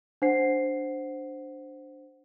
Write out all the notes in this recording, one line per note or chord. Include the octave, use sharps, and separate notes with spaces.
D4 C5 F#5 C7